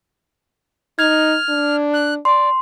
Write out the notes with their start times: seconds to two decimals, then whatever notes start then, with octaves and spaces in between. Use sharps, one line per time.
0.99 D#4 F6 G#6
1.49 D4
1.94 F#6
2.25 D5 C6